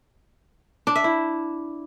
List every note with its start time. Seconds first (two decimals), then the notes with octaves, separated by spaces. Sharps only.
0.87 D4
0.96 E5
1.04 E4